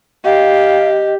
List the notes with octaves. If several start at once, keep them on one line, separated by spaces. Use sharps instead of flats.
G4 D#5 F5